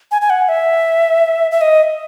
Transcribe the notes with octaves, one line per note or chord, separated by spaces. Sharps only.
G#5
G#5
F#5
E5
E5
D#5